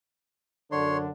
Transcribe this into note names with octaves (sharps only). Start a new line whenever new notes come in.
F#2 D3 D4 C#5 C6